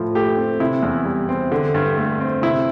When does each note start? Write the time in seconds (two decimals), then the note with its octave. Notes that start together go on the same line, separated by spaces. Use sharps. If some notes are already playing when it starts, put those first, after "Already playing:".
Already playing: A2 F3
0.15 A3 G4
0.37 C4
0.60 C3 E4
0.83 E2
1.05 G3
1.29 C4
1.52 D3
1.74 G2
1.97 A3
2.20 C4
2.42 C3 E4